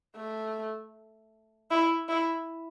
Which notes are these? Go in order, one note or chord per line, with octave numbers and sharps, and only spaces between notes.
A3
E4
E4